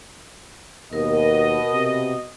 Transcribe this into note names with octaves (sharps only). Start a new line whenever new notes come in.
D#2 B2 A#4 D#5
C3